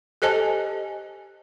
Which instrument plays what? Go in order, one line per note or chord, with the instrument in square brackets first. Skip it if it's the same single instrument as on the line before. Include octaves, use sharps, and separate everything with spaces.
[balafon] G4 A4 C5 D#5 G#5 A5